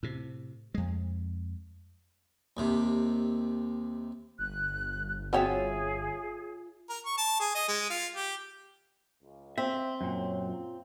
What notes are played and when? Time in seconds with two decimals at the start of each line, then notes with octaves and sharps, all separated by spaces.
0.03 A2 C3
0.74 F2 G#3
2.57 D#2 C3
4.39 G1 F#6
5.33 C4 F4 F#4 G#4 C#5 E5 G5
6.90 A#4
7.05 C#6
7.18 A5
7.40 G#4
7.55 D#5
7.68 G#3
7.90 F4
8.16 G4
9.22 C#2
9.58 C4 E5
10.01 F#2 A#2 C#5
10.45 F4